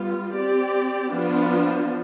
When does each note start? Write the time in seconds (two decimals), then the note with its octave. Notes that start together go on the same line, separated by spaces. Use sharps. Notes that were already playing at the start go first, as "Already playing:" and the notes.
Already playing: G3 B3 F4
0.36 C4 G4 D5
1.14 F3 B3 D4 F4